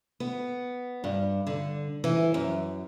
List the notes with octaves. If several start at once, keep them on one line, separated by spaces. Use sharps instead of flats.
B3
G2
D3
E3
F#2